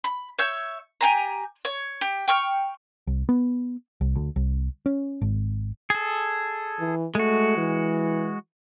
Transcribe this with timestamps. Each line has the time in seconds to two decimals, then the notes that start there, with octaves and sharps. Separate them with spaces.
0.04 B5
0.39 C#5 E5 G6
1.01 G4 G#5 A#5
1.65 C#5
2.01 G4
2.28 G5 C#6 F6
3.07 C2
3.29 B3
4.01 C2
4.16 D2
4.36 C2
4.86 C#4
5.21 G#1
5.90 G#4 A4
6.79 E3
7.15 G#3 A3 F#4
7.57 E3